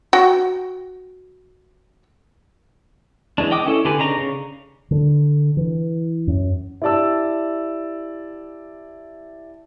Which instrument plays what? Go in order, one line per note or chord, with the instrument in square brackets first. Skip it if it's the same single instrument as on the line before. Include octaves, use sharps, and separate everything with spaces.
[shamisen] F#4 G5
[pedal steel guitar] E3 G#3 D4
D#5 G5 D6 D#6
C#4 E4 A4
D3 G4 A4 B4 G#5
C#3 D4 D#4 A#5
C#3
[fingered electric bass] D3
E3
F#2
[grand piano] E4 G4 D5 A5 E6